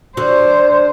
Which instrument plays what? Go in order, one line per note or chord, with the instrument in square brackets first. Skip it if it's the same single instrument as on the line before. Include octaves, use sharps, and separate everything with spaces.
[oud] D3 F#4 [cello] C5